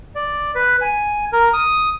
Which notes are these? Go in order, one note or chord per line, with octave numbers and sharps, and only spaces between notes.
D5
B4
G#5
A#4
D#6